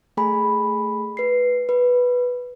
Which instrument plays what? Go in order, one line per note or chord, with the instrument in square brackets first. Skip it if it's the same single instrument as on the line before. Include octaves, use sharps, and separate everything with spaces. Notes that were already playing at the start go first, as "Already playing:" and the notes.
[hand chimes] A3 G#4 G#5 B5
B4 C7
B4